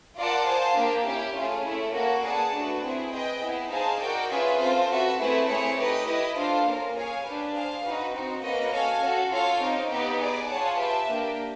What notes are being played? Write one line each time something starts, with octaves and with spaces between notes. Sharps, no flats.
F4 A#4 D5 F#5 A5
G#4 C5 F5 A5
A#3 D4 G4
C#4 E4 G4
A3 C#4 F4 G#4
A3 C#4 E4
A#3 C#4 F#4 A4
G#4 B4 D5 F#5 A5
A3 D4 F#4 B4
C4 E4 G#4
G#4 B4 D#5 G5
B3 E4 G#4
D#4 G#4 C5 F5 A5
F#4 A#4 D5 G5
C#4 F4 G#4 B4 E5
C4 F4 A4 C5
F#4 B4 E5
A3 C4 E4 G#4 B4
A3 C4 E4 G#4 C#5
D#4 G4 B4 D#5
E4 G4 B4 D#5
D4 F4 A4 C5 F5
A#3 C#4 F4 A#4
G#4 C#5 F5 G#5
D4 G4 B4
G#4 C5 F5
D#4 F#4 B4
C4 D#4 F#4
A#3 C#4 F#4 B4 D#5
F#4 A4 C#5 F5 G#5
C#4 F#4 A4
F4 A4 C#5 F5
C4 D#4 G4
B3 D#4 G4 B4
G#4 B4 D5
F4 G#4 C#5 F#5 A5
G4 B4 E5 A5
A#3 D4 G4